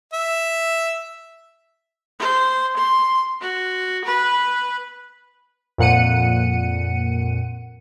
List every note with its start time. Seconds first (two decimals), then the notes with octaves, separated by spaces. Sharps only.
0.13 E5
2.19 C5
2.77 C6
3.41 F#4
4.05 B4
5.78 F2 A#2 F#5 C#7 D#7